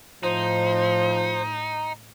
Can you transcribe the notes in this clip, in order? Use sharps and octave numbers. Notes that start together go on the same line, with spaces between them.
A2 F3 D#4 C5